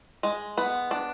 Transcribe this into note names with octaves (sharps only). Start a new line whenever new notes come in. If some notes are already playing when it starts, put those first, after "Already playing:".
G#3
B3
D4